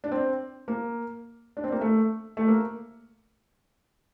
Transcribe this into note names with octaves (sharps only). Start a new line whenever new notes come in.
D4
C4
A#3
D4
C4
A#3
A3
A3
A#3